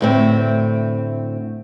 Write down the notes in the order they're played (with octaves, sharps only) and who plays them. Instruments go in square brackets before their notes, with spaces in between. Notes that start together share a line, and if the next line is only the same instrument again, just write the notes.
[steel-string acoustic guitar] D2 A2 C4